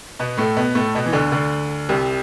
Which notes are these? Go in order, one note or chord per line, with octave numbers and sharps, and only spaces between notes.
B2 B3
A2 A3
B2 B3
A2 A3
B2 B3
E3
D2 D3
D2 D3
C2 C3